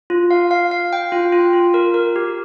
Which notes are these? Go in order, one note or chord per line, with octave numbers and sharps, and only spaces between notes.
F4
F5
F5
F5
G5
F4
F4
F4
A#4
A#4
G4